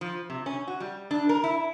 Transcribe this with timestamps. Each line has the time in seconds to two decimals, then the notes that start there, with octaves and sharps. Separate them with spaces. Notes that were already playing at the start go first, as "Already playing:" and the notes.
0.01 F3
0.30 C3
0.46 C#4
0.68 F#4
0.80 G3
1.11 D4
1.29 A#4
1.44 E4